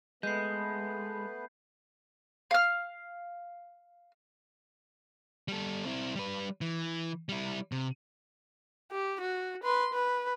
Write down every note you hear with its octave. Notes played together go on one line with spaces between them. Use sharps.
G#3 A3 B3 B4 G6 C7
F5 F6
G3 A4
C4 E4
G3 B4
E3
G3 E4
C3
G4
F#4
B4 C6
B4